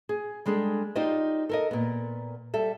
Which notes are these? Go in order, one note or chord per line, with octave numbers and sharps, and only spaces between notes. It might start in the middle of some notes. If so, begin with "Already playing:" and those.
G#4
G3 G#3 D4 G#4 A4
D#4 F4 G4 C5 D5 D#5
A4 A#4 D#5
A#2 B3
G3 A4 E5